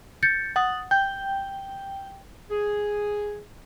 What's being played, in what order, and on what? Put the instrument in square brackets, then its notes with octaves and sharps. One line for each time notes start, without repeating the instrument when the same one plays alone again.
[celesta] G6 A6 C#7
[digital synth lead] F#5 [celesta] D#6 A6
[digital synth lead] G5 [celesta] G6
[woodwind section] G#4